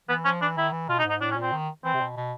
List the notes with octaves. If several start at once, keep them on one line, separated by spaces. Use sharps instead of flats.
E3 B3
F3 C#4
E3 D4
D#3 E4
E3
B2 F4
D#4
G#2
D#4
A2 D4
C#4
A#2
C4
D#3
E3 C4
C3
B2
B2